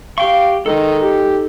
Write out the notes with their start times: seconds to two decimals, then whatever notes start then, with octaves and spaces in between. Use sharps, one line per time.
0.18 G4 F5 G5 C#6
0.66 D#3 G#3 D#4 A4
1.02 G4